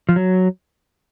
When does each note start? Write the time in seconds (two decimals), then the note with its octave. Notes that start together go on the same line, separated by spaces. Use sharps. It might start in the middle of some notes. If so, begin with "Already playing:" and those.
0.09 F3
0.16 F#3